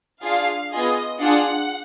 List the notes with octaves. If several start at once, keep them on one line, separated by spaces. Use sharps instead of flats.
D4 F4 G#4 F5
B3 F4 G#4 D#5
D4 F4 G#4 F#5